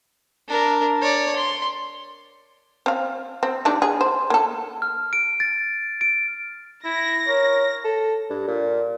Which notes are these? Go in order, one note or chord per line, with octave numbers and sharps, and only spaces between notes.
D4 A#4
C#5 D5
C6
C4 F5
C4
G3 D4 D#4
G#4
C5
A#3 A4
F6
D7
A6
D7
E4 A#6
A#4 C#5
A4
G2
A#2